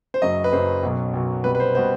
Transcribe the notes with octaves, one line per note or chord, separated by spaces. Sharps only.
C5
F#1 F#2 F#3 D#5
B4
F#1 F#2 F#3 C5
B1 B2 F#3
B1 B2 F#3
C2 B2 G3 B4
B4
C5
B2 G3 C5